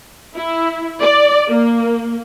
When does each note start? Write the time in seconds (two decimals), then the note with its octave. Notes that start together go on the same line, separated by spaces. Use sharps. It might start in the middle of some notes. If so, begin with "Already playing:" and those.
0.35 E4
1.01 D5
1.49 A#3